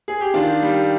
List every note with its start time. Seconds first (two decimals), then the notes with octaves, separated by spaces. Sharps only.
0.08 G#4
0.21 G4
0.34 D#3 D4 F4
0.62 G3